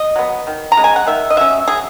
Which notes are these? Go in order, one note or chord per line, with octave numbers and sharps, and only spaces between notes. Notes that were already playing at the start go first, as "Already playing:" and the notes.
Already playing: D#5
F#3 B3
D#3
A#5
G#3 C#4
G#5
F#5
D#3 E5
D#5
F#3 C#4 E5
F#3 G#4